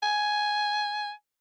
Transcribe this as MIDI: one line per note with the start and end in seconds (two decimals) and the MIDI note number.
0.03 1.12 80